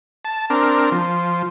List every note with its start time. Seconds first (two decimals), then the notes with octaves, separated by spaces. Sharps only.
0.25 A5
0.50 C4 D4 A#4
0.92 F3